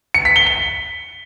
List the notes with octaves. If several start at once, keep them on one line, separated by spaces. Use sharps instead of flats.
C#7
B6
G7
G7